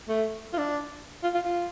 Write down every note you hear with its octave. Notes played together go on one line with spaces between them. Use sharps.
A3
F4
D4
F4
F4
F4